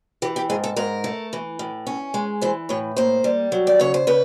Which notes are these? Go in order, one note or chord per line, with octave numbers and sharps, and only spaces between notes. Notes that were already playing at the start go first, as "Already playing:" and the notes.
E3 G4
G4
G#2 G#4
A4
G#2 A#4
A3
E3
A2
C#4
G#3
E3 C5
A2 C#5
A#3 C5
G3
F#3
D5
C#3 C#5
C5
C#3 B4